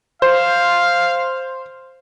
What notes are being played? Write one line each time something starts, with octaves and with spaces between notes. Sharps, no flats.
C5 F5